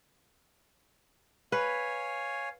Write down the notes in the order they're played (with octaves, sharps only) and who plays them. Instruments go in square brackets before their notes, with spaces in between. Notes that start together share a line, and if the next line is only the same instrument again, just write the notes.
[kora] B4 [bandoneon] C#5 F5 G#5